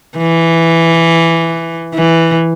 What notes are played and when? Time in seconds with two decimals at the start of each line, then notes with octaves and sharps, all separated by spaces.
0.18 E3
1.95 E3